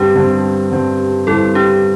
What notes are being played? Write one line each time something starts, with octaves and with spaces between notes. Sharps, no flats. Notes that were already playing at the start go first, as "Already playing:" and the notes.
Already playing: G2 D3 C4 D4 G4
G2 D3 C4
G2 D3 C4
G2 D3 C4 E4 A4
D4 G4